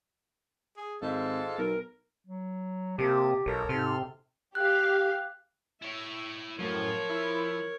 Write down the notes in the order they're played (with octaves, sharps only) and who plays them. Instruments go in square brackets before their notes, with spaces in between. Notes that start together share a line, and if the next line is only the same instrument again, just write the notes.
[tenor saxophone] G#4
[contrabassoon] G#1 [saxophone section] G#2 F4 F5 [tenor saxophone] A4
[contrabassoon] B1 [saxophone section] A#4
[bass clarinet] F#3
[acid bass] C3 [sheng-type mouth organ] A#3 A5 D#6 [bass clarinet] G4
[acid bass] B1 [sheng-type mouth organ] A4 A#4 C#5
[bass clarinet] G#2 [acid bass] C3 [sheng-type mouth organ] A4 C6 F6
[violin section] G4 F5 [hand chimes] F#6
[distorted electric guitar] E4 C#5 [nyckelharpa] E5
[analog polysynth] F#2 A2 [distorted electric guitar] F3 [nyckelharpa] A#4 C#5
[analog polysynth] E4